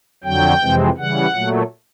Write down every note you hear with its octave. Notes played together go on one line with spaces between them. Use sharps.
F2 D3 F#3 G5
F2 C3 E3 G#3 C4
C#3 E3 G3 F#5
A#2 F#3 A3